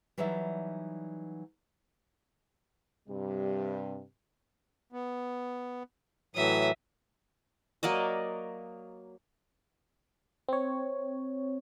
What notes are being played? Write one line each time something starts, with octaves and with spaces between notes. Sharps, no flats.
E3 F#3 G3 D#4 D5 E5
G2 C3 G3
B3
A2 E3 F#3 E5 D#6
F#3 A#3 D5 D#5
C4 C#5